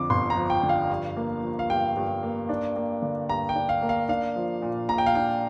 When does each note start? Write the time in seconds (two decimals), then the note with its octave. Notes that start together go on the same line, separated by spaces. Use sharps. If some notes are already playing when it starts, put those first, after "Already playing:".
Already playing: F2 D3 F3 D6
0.10 G1 C6
0.30 A#5
0.37 F3
0.50 G5
0.63 D3
0.69 F5
0.90 G2
1.17 A#3
1.43 F3
1.59 F5
1.70 G2 G5
1.96 G2
2.23 A#3
2.49 D4
2.76 A#3
3.02 D3
3.29 G2 A#5
3.49 G5
3.55 D4
3.69 F5
3.82 A#3
3.89 F5
4.08 D4 F5
4.36 F3
4.62 A#2
4.89 A#1 A#5
4.98 G5
5.06 F5
5.15 D4 G5